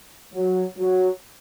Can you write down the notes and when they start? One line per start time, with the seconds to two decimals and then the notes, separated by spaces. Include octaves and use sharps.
0.34 F#3
0.78 F#3